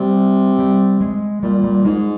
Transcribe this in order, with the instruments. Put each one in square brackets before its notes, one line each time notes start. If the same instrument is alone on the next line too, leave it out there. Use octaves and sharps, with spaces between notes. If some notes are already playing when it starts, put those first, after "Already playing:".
Already playing: [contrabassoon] C3 [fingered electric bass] G3
[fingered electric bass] G3
G#3
[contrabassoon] A#2 [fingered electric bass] G3
[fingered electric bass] G3
[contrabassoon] G#2 [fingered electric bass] G#3